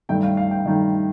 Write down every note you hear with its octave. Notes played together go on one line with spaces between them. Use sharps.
G2 D#3 A3 G5
F5
F5
G5
G2 D#3 A3